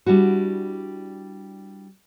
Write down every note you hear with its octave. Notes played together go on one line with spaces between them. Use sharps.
G3 D4 E4 F#4